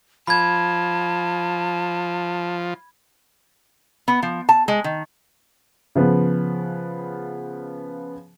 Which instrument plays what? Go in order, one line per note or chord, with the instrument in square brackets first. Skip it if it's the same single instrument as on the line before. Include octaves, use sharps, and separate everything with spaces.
[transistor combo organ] F3 [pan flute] A5 [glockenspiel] B5 G#6
[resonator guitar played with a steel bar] B3
F3
A5
G#3
D#3
[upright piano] C#3 F3 B3